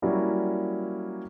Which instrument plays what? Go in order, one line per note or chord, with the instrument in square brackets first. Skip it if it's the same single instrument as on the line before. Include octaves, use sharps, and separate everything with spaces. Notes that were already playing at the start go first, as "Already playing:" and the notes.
[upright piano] F#3 G3 A#3 C#4 E4